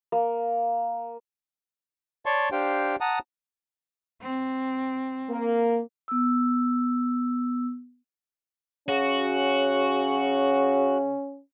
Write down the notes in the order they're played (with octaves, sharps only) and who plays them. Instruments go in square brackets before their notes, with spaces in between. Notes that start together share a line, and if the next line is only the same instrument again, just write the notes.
[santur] A#3
[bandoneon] C#5 D5 A5 C6 C#6
D4 G4 C5 F5 G5
F#5 A5 A#5 D#6
[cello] C4
[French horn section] A#3
[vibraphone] B3 E6
[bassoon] C#3 [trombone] C#4 [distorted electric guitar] F#4